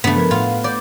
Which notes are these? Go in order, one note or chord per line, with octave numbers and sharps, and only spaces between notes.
G2 C#3 A3 B3 D4
F3 A#4 G#6
A2 F4 F5 F#5
D5 G6